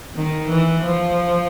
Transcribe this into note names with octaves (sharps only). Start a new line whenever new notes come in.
D#3
E3
F3